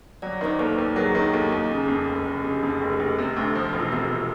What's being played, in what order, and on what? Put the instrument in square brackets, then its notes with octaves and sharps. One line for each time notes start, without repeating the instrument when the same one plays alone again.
[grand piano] F#3 [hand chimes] D5
[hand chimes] C#5
[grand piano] D#3 [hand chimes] C5 D5
[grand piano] D#2 [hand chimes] A4 B4
[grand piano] D#2
[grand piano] F#3 [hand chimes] G#4 A#4
[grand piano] D#3
[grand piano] D#2 [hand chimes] G4 A4
[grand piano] D#2
C#3
F2
F1
F1
[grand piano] C#3 [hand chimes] G4
[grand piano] F2 [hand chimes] G#4
[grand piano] F1
[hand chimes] G4
[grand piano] F1
C3
D2
F3
E1
[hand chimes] F4
[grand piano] C3 [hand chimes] F#4